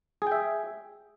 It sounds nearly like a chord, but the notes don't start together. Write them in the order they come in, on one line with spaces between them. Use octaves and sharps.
G#4 G5 E5